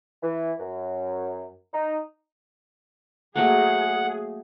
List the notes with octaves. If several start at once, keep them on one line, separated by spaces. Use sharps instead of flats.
E3
F#2
D#4
F#3 A3 A#3 G#4 F#5